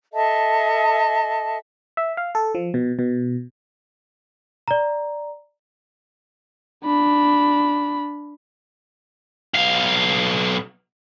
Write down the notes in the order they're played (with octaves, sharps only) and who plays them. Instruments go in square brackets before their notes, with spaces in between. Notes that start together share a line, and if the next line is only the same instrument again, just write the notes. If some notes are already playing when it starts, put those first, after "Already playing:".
[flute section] A4 D#5 E5 A5
[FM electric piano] E5
F5
A4
F3
B2
B2
[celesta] D5 A#5
[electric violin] D4 B5
[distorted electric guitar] B1 F5